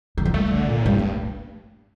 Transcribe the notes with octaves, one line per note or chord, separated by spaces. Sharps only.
D#3
F3
G3 A3
D3
A#2
A2
G2 G3
A3